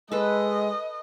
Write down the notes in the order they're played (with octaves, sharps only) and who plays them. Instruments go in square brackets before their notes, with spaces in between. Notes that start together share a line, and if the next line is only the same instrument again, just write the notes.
[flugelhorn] G#3 [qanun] A4 B4 [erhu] D#5